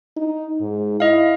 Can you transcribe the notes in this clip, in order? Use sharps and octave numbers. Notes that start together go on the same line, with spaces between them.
D#4
G#2
E4 D#5 F5